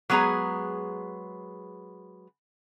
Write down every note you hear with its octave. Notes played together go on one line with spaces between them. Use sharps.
F#3 G#3 B3 G#4 A#5